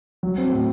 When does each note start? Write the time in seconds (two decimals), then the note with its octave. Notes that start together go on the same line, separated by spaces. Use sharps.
0.23 F#3
0.38 C4
0.52 A2